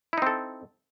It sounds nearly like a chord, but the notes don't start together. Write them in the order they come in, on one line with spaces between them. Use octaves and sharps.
E4 D#4 C4 A4